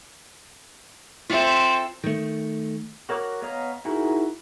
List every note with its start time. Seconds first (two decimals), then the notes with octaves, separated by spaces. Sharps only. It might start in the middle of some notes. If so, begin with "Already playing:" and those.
1.30 C4 F4 A4 E5
2.04 D#3 A3
3.09 F#4 A#4 C#5 D6
3.42 B3 C#5 D#5 F5 A#5
3.85 D#4 E4 F#4 G#4 A#4